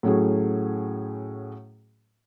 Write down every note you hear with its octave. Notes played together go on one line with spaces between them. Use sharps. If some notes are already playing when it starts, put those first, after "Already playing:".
A2 F#3 A3 C#4 F#4 G#4